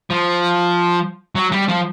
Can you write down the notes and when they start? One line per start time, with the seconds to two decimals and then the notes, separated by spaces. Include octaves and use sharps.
0.10 F3
1.35 F#3
1.52 G3
1.69 F3